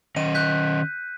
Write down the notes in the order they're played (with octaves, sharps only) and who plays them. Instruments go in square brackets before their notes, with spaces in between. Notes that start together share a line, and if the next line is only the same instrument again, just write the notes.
[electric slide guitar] D#3 C#4 D#5 [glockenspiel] D#7
[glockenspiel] F#6 G6 B6